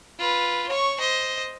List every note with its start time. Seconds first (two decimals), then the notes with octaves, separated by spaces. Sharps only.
0.19 F4 B4
0.69 C#5 C#6
1.00 C5 D#5